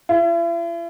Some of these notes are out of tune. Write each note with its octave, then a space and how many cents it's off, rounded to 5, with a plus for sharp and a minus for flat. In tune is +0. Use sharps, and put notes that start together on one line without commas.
E4 +45